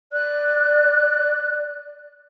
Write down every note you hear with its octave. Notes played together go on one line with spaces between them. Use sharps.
D5 F#6